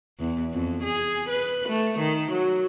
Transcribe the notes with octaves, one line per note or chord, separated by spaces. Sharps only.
E2
F2
G#4
B4
A3
D#3
F#3